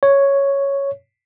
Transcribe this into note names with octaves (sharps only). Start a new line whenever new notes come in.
C#5